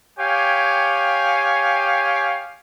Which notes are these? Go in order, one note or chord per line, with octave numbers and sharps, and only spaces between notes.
G4 C#5 F5 G5 G#5